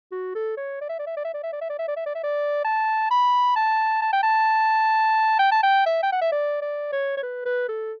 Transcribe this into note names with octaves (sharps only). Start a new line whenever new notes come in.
F#4
A4
C#5
D5
E5
D5
E5
D5
E5
D5
E5
D5
E5
D5
E5
D5
E5
D5
E5
D5
A5
B5
A5
A5
G5
A5
G5
A5
G5
E5
G5
F#5
E5
D5
D5
C#5
C#5
B4
B4
A4